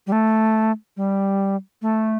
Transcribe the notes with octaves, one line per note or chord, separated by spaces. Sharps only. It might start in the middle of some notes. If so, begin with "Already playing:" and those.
G3
A3
G3
A3